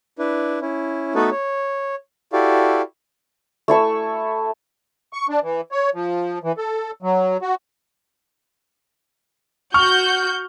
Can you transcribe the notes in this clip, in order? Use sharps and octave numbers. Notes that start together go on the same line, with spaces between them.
D4 E4 B4
C#4 E4
A3 B3 D#4 F#4 A4 B4
C#5
E4 F#4 G4 A4 D5 F5
A3 E4 C#6 E6
C#6
D4
E3
C#5
F3
E3
A4
F#3
F#4
F#4 C#6 F6 G6